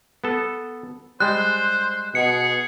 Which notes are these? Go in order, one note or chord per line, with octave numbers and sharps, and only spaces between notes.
B3 A4
G3 G#3 C5 F#6
B2 G#4 C#7